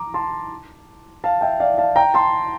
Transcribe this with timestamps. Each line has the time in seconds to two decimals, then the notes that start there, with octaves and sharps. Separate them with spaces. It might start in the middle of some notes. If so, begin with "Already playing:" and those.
Already playing: A#5 D6
0.14 A5 C6
1.24 F5 A5
1.41 E5 G5
1.60 D5 F5
1.78 F5 A5
1.96 G5 A#5
2.14 A5 C6